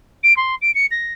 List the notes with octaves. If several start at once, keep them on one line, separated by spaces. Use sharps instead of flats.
D7
C6
D7
C#7
A#6